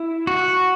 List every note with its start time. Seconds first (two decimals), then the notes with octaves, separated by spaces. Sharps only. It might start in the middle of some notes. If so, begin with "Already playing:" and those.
Already playing: E4
0.27 F#4